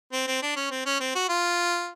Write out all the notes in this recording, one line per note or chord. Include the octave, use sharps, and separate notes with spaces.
C4
C4
D4
C#4
C4
C#4
C4
F#4
F4